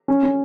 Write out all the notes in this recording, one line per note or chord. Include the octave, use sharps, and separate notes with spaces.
C#4
C#4